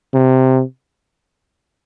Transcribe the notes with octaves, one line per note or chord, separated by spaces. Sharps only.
C3